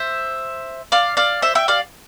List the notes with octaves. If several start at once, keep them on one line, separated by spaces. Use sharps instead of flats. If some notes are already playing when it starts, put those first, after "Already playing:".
Already playing: C5 E5
D5 F5
D5 F5
C5 E5
E5 G5
D5 F5